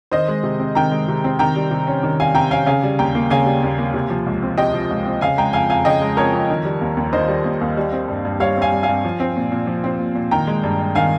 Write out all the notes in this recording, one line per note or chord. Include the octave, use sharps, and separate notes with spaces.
D#3 C5 D#5
G#3
C3
C4
D#3 G5 A#5
G#3
C3
C4
D#3 G5 A#5
G3
C3
C#4
D#3
G3 F5 G#5
C3 G5 A#5
C#4 F5 G#5
C#3 F5 G#5
G3
D#2 G5 A#5
A#3
C#3 F5 G#5
G3
D#2
A#3
C3
F3
C#2
C4
C3 D#5 G5
F3
C#2
C4
C#3 F5 G#5
G#3 G5 A#5
F2 F5 G#5
F2 F5 G#5
C#3 D#5 G5
G#3
F2 A#4 C#5
F2
D#3
G3
D#2
D#2
D#3 C5 D#5
G3
D#2
D#2
G3
C4
G2
G2
G3 C#5 F5
C4
F5 G#5
G2
G2 F5 G#5
F3
C4
A#2
A#2
F3
C4
A#2
A#2
D#3 G5 A#5
G#3
G2
G2
D#3 F5 G#5